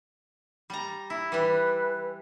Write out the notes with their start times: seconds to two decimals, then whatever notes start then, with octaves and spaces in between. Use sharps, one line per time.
0.70 G3 A#5
1.10 E4
1.32 E3 G3 B4